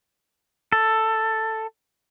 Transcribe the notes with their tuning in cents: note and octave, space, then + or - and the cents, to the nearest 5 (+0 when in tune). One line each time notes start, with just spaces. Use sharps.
A4 +10